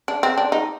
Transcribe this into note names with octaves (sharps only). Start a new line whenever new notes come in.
D4
C4
D4
D#4